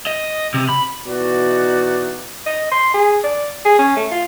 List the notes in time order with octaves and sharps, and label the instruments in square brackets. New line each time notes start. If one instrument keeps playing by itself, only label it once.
[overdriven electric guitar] D#5
C3
B5
[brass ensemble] B2 E3 D#4 F#4 D5
[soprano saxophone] D#5
C6
G#4
D5
G#4
C#4
A3
F4